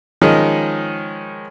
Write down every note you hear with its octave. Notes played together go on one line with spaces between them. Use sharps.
D#3 F3 G#3 C#4 D#4